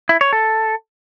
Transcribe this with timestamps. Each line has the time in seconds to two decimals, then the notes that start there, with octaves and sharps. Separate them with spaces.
0.09 E4
0.21 C#5
0.33 A4